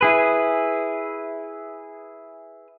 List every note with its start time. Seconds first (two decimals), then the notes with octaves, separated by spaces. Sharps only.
0.01 E4 G#4 B4